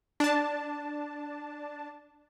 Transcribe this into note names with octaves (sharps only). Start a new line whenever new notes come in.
D4 A5